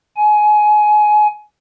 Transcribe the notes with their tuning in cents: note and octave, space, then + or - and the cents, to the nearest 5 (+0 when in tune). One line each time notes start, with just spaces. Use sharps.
G#5 +25